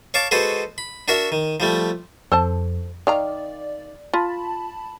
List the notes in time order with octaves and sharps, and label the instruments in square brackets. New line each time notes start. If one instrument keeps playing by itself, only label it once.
[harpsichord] C#5 F5 A5 D6
G#3 F#4 A4 B4 C5
B5
D4 F#4 A#4 E5
D#3
F3 G3 A3
[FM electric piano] F2 [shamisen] A4 C5 A5
[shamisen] D#3 F5 A#5 [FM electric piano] D5
[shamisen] F4 [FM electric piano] A5 B5